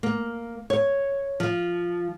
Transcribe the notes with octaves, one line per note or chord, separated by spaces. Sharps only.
A#3
C#5
F3